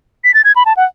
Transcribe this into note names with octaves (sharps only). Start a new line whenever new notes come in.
B6
A6
G#6
B5
A5
F#5